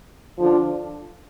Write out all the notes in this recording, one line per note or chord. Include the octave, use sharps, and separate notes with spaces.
D3 F3 D4 F4